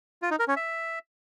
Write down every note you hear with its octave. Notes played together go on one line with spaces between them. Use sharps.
F4
D#4
A#4
C#4
E5